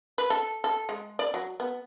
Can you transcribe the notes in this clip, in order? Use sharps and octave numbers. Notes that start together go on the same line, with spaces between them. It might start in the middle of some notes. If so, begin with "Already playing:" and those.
B4
A4
A4
G#3
D5
F#3
B3